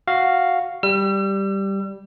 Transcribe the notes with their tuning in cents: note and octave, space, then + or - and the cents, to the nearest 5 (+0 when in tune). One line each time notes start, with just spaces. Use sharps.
F#4 +0 F5 +0
G3 +0 E6 +45